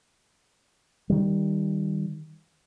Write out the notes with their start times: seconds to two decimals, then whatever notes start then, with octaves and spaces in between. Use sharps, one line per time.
1.10 D#3 G3